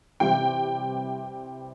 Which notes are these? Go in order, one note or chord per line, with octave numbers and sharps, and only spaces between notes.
C3 E3 G3 C4 E4 G5